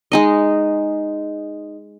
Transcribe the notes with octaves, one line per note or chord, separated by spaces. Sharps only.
G#3 D#4 D#5